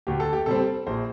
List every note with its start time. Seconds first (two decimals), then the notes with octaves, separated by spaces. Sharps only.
0.07 D2 G4
0.20 A4
0.33 G4
0.46 C3 G3 C4 A4
0.87 A#1 C5